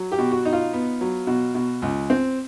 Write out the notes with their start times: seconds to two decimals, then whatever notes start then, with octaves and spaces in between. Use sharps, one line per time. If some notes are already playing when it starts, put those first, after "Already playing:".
Already playing: F#3
0.12 G4
0.18 B2
0.32 F#4
0.45 D#4
0.53 F4
0.73 B3
1.01 F#3
1.27 B2
1.55 B2
1.82 C#2
2.10 C4